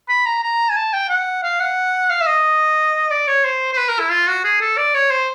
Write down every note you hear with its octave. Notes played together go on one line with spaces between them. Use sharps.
B5
A#5
A#5
G#5
A5
G5
F#5
F5
F#5
F5
E5
D#5
D5
C#5
C5
C5
B4
A#4
E4
F4
F#4
G#4
A4
D5
C#5
C5